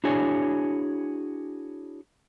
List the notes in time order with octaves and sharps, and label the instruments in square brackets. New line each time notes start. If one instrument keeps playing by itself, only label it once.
[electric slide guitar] D4 E4 F#4 G#4 C#5 G#5